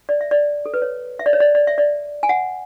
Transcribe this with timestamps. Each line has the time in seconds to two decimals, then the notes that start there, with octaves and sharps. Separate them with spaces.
0.09 D5
0.21 E5
0.31 D5
0.66 A4
0.74 B4
0.82 C#5
1.19 E5
1.26 D5
1.33 C#5
1.40 D5
1.55 D5
1.67 E5
1.78 D5
2.23 G#5
2.29 F#5